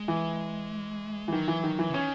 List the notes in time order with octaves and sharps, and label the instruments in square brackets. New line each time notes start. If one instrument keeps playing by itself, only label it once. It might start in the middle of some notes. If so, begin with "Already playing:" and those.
Already playing: [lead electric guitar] G#3
[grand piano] E3
E3
[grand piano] D#3 [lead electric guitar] F#3
[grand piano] E3
D#3
E3
[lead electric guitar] C#3
[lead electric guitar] D#3 [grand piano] C#4